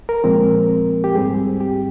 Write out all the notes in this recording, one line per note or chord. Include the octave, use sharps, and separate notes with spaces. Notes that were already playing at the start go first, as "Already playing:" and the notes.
A#4
A#2 F3 G#3 C4
G4
G#2 G3 C4 G#4
G4